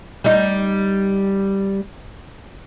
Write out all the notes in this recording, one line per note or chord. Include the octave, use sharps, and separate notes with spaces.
G3 D#4